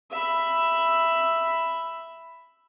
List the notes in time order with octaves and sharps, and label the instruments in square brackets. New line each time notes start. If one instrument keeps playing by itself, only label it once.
[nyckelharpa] E5 B5